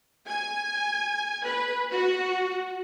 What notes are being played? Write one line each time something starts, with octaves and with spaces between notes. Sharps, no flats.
G#5
B4
F#4